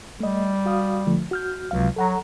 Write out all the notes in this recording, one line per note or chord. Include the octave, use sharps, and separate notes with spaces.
G3 A3 D#5
F#4 F5 D#6
D3 F3 A3
F#4 F6 G6
C#2 C3 F#3 F5
F#3 A4 F#5 A#5